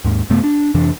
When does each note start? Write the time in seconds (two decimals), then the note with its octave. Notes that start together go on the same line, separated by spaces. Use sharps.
0.04 D#2 G#2
0.30 F#2 C3 A3 B3
0.44 D4
0.74 F2 C3 E3 D4